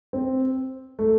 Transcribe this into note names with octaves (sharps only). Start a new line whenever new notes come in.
C4
A3